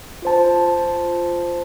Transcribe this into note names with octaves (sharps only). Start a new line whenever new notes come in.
F4 C5 A5